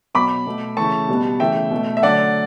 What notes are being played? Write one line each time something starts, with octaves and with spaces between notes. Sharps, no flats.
B2 F#3 B3 B5 D6
B2 A3
C#3 E3 A3 A5 C#6
B2 G3 B3
C#3 E3 A3 E5 G5
B2 A3
E5
D3 F#3 A3 D5 F#5